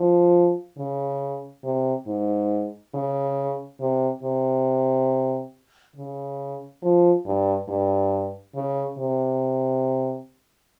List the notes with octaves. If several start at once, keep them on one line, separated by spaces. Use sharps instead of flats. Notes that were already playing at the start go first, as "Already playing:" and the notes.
Already playing: F3
C#3
C3
G#2
C#3
C3
C3
C#3
F3
G2
G2
C#3
C3